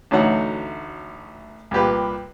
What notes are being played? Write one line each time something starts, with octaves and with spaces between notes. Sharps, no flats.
A1 D2 F#3 D#4 C#5 F#5
C2 A#2 G4 B4